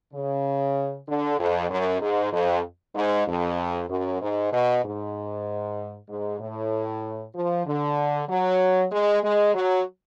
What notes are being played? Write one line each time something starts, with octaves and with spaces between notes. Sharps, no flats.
C#3
D3
F2
F#2
G#2
F2
G#2
F2
F#2
G#2
B2
G#2
G#2
A2
F3
D3
F#3
G#3
G#3
F#3